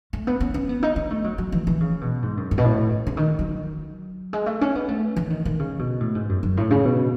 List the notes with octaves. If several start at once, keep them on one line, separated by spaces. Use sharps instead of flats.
A3
B3
C#4
C#4
B3
D#4
C#4
A3
F#3
F#3
E3
E3
C#3
B2
G#2
F#2
G#2
B2
A2
C#3
D#3
F#3
G#3
A3
C#4
B3
A3
E3
D#3
D#3
C#3
B2
A2
G#2
F#2
F#2
A2
C#3
B2